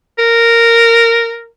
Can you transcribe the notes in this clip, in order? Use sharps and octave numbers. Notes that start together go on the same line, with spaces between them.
A#4